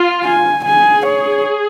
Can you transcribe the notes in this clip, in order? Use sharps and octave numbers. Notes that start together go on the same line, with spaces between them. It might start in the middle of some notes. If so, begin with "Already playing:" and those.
Already playing: F4
G#5
G#4 G#5
C#5